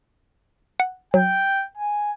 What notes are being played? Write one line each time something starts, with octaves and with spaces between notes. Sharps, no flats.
F#5
F#3 G5
G#5